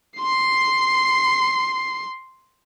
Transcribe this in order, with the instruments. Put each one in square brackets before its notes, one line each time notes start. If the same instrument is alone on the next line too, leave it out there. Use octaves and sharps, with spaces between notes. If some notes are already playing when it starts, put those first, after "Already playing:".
[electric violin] C6 C7